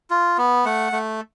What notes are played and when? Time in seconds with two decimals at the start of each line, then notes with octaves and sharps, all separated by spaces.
0.10 F4
0.38 B3
0.65 A3 F#5
0.92 A3